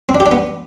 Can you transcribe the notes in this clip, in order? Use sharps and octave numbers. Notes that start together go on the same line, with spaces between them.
C4
D4
G4
D4
B3